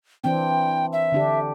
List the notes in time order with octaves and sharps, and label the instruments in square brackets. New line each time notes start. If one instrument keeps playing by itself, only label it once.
[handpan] E3 C4 D4 [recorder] G5
[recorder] E5
[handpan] D3 D4 G4